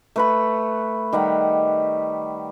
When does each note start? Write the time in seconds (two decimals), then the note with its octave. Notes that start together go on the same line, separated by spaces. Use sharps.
0.16 A3 B4 B5
1.13 D#3 G3 F#5 B5